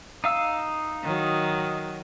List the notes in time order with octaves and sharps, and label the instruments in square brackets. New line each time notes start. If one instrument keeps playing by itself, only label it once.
[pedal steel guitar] D#4 F5 E6
[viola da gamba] D#3 F#3